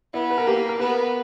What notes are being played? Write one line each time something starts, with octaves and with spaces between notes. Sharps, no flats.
B3 E4
B4
A#4
A#3 G4
A#4
B3 B4